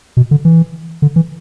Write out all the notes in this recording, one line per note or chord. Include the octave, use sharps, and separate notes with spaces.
B2
D3
E3
D3
E3